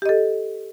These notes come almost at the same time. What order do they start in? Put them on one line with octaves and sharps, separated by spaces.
G4 D#5 A4